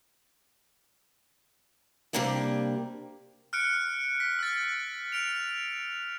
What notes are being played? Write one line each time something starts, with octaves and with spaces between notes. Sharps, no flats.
C3 F#3 G3 A#3 D4 D5
F6 F#6 C#7 D7
B6
E6 F#6 A6
F6 D7 F7